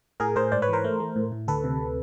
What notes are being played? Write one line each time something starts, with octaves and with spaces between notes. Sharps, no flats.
A2 G#4 A#4
A2 A#4 C5
G#2 C5 D5
B4 C#5
E3 A#4 C5
A3
A3
A2
A2
D2 A4 B4
C3